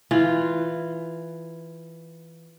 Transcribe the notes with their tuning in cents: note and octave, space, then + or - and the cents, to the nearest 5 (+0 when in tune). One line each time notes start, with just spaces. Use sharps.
E3 +0 F4 -10